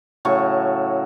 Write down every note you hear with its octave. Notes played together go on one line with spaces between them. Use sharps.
A2 C#3 F#3 C#6